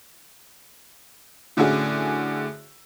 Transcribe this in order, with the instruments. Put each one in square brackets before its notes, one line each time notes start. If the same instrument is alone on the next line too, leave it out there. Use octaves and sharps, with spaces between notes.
[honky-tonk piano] A2 D3 C#4 E4 F#4 G#4